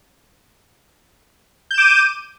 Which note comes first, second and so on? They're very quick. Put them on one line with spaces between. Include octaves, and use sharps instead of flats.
G6 E7 D6 D#7